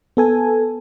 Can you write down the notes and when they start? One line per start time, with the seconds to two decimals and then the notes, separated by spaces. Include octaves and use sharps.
0.17 B3 A4 G#5